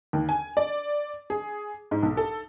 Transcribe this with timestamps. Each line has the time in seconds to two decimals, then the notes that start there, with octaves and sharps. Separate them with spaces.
0.13 D#2
0.29 G#5
0.57 D5
1.30 G#4
1.91 G#2
2.03 B1
2.17 A4